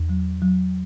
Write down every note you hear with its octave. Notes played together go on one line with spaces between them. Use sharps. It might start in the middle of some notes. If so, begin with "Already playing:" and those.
Already playing: E2
F#3
F#3